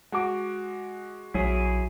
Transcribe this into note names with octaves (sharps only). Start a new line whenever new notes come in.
G#3 F#4 F#5 D6
A#1 F#3 E4 G#4